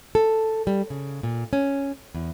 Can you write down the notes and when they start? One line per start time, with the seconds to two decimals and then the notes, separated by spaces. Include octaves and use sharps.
0.15 A4
0.67 G3
0.90 C#3
1.23 A#2
1.53 C#4
2.15 E2